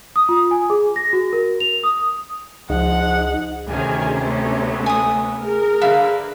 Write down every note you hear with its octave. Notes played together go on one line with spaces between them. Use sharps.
D#6
F4
G#5
G#4
A#6
F#4
A#4
F7
D#6
C#2 F3 D#4 G#4 D#5 F#5
D2 C3 D#3 C#4 G#4 G#5
A3 B3
G#5 D#6
G#4 A#4
D3 B4 E5 F5